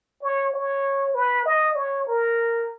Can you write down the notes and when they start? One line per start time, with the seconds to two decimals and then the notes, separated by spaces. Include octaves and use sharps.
0.23 C#5
0.54 C#5
1.15 B4
1.45 D#5
1.76 C#5
2.07 A#4